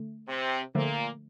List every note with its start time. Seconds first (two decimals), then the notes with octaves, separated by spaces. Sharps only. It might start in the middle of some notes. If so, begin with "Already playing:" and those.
Already playing: D3 A3
0.28 C3 C4
0.75 A#2 D3 F3 A3 A#3